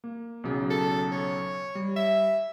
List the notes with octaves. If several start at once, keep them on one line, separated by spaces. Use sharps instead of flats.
A#3
B1 C#3 F#3
A4
C#5
G3
E5